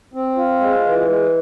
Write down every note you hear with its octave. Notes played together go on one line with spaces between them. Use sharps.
C4
F4
G#3
E3
G#3